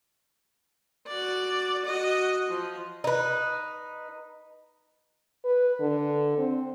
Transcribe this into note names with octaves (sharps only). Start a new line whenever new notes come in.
F#4 D5
F#4 D#5
F3
D#4 B4
B4
D3
C4